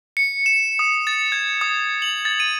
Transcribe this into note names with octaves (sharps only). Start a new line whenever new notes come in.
C#7
E7
D#6
A6
G#6
D#6
F#7
A6
D#7